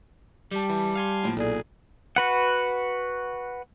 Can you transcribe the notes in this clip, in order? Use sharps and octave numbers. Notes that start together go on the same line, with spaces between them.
G3 G4 A5
E3
F5 G#5 C6
A2 F3 A#3
B1 A#2 G#4 A4 D5
F#4 B4 F#5